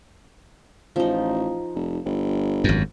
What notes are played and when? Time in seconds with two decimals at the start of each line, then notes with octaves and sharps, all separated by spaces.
0.96 A1 F3 D#4
1.75 F1
2.05 G1
2.64 G#1 F#2